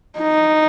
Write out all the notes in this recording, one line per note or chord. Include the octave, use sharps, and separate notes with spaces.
D#4